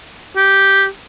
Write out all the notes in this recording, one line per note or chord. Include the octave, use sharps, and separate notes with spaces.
G4